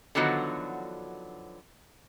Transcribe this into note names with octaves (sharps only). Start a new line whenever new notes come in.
D3 D#3 F3 F#3 B3 F#4